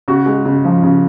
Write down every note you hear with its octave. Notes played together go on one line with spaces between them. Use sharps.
C#3 F#4
G#3
C#3
F3
C#3